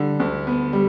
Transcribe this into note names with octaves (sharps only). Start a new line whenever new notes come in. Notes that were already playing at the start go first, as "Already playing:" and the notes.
Already playing: D3 G3
D2
B3
G3